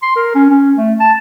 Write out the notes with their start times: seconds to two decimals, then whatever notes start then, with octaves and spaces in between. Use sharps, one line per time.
0.02 C6
0.16 A#4
0.35 C#4
0.50 C#4
0.77 A3
1.00 A5